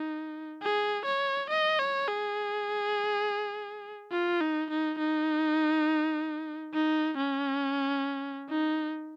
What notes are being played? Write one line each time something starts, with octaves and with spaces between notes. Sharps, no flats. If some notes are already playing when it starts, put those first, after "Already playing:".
Already playing: D#4
G#4
C#5
D#5
C#5
G#4
F4
D#4
D#4
D#4
D#4
C#4
D#4